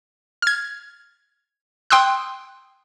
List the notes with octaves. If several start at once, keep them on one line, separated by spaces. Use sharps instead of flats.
F6 G#6
G5 C6 D#6 E6 F#6